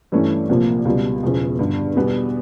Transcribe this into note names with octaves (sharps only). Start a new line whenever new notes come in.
G2 E3 A3 C#4
C2 A#2 F3 A#3
C#2 B2 G3
E1 E2 C#3 F3
G2 D3 G3
E2 B2 G3 B3